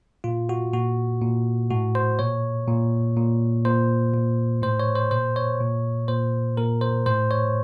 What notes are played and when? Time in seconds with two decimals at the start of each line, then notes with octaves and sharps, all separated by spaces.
0.24 A#2 F4
0.49 F#4
0.73 A#2 F#4
1.22 A#2
1.71 A2 F#4
1.95 C5
2.19 A#2 C#5
2.68 A#2
3.17 A#2
3.65 A#2 C5
4.13 A#2
4.62 A2 C5
4.80 C#5
4.95 C5
5.11 A#2 C5
5.36 C#5
5.60 A#2
6.08 A#2 C5
6.57 A#2 A#4
6.81 C5
7.06 A2 C5
7.31 C#5